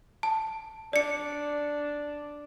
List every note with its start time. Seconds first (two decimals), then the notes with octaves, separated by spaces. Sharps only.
0.23 A5
0.93 D4 D5 C#7